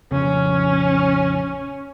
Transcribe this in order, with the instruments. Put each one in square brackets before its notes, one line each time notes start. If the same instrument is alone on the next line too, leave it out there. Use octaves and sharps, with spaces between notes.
[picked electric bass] A#1 F2 C#3 [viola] C#4